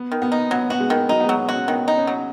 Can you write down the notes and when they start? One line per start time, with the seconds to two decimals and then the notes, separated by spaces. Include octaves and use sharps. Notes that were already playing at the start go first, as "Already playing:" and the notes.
Already playing: B3
0.12 D#3
0.22 B3
0.32 D#4
0.51 F#3 B3
0.70 B3 F#4
0.80 G#3
0.90 D#3
1.09 F#3 D#4
1.20 B3
1.25 F#3 G#3
1.38 B3
1.49 C#4 F#4
1.68 D#3 B3
1.88 D#4
1.98 C#4
2.07 F#3